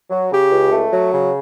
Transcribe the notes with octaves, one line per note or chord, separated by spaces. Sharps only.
F#3
C#3 G4
C#2
A3
F#3
C#3